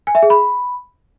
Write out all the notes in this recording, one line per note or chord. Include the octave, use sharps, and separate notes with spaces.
G#5
E5
G#4
B5